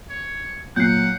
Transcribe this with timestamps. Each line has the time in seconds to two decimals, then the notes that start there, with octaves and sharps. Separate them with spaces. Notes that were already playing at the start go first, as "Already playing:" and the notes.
0.10 C#5
0.76 A#2 F#3 F#5 G6 C7